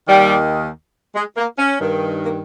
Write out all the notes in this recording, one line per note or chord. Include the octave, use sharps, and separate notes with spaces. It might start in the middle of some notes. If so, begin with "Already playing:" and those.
D#2 D#3 G3
G#3
A#3
C#4
G2 D#3
A#3